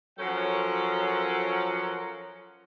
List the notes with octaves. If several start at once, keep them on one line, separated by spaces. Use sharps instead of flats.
F3 F#3 C#4 A4 A#4 F#5